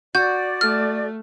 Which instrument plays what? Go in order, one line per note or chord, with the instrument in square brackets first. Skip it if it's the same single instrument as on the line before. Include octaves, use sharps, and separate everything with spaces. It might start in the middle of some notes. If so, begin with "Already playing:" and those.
[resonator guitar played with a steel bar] F#4 [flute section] D5 [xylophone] G6
[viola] A3 [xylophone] F6